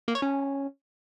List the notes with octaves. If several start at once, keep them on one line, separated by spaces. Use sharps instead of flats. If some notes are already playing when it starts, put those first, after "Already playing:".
A#3
C#5
C#4